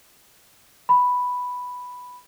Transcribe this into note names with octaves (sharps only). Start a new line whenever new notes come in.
B5